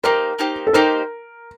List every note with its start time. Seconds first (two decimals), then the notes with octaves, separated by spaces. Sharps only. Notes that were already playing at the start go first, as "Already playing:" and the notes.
0.04 A#3 D#4 G4 A#4 C5
0.39 A#3 D#4 G4 C5
0.67 A4
0.73 A#3 D#4 G4 A#4 C5